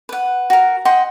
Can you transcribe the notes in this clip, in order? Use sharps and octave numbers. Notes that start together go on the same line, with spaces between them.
B4 F#5
F#4 A#4
D#5 F#5 G5 C6